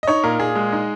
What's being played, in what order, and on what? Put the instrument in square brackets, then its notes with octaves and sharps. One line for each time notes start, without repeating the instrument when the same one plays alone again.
[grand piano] D#5
D#4 C#5
A#2 A#4
A#2 G#4
G#3
D#4